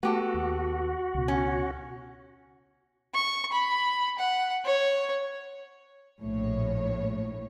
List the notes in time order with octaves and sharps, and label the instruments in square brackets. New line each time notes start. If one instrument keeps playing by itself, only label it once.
[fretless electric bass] A3 [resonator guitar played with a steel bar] B3 G4 A4 [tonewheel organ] F#4
[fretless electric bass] D#2
C#2 B2
[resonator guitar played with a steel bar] C#4
[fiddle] C#6
B5
F#5
C#5
[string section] A#1 A2 C#5